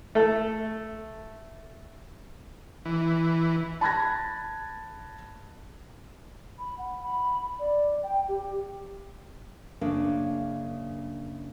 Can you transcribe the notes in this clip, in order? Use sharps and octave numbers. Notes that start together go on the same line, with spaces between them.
A3 A4
E3
A5 B5 F#6 G#6 A#6
B5
F#5
B5
D5
G5
G4
F#2 C#3 A#3 D4